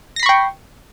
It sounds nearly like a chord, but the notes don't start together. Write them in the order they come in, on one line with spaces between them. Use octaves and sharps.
A#6 C7 B5 C#6 G5